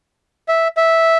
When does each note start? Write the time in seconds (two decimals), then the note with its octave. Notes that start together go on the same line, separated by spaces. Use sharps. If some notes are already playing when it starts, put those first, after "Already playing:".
0.48 E5
0.77 E5